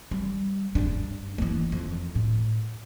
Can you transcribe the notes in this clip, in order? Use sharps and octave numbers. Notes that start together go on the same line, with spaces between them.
G3
G2 D4
E3 A#3
F2
A2